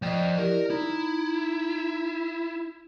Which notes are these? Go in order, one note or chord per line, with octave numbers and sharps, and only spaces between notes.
F3 D5 D#5 G5
E4 G4 A#4 D5
D#4 E4 A#5